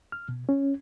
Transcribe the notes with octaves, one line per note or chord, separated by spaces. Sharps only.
F6
B2
C#4